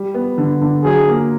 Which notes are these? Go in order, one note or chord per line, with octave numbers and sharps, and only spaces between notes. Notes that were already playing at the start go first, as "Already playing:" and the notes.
Already playing: G3
B3
D3
D3
F#3 G#4
A#3